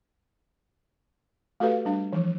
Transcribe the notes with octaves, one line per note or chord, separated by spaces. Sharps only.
A3 F#4 G4 A4 B4 F5
G3 D4 F5
E3 F3